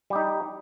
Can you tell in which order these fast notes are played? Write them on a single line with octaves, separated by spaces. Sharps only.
G3 G4 D#4